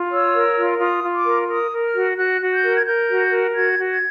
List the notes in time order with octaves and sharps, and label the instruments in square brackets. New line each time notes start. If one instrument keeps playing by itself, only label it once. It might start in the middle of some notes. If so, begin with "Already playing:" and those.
Already playing: [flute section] F4
C#5 E6
A#4
F4
F4 D#6
F4
D6
A#4
A#4 D#6
A#4
F6
F#4
F#4 F#6
F#4
G6
A#4
G#6
A#4 G6
F#4
A#4
F#4 G#6
F#4
G#6